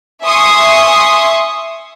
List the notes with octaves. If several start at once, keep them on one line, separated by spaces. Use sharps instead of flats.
E5 G#5 C6 C#6 D#6